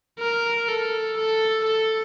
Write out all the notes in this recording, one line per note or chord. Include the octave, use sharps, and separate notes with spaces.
A#4
A4
A4
A4